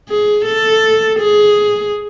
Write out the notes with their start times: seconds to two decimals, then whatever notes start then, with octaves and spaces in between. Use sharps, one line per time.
0.09 G#4
0.45 A4
1.20 G#4